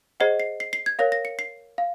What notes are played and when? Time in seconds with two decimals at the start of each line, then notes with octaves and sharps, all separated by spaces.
0.20 G#4 C5 D#5 F#5 C7
0.40 C7
0.60 C7
0.73 C7
0.86 G#6
0.99 A#4 C#5 F5 A#6
1.12 A#6
1.25 C#7
1.39 C7
1.78 F5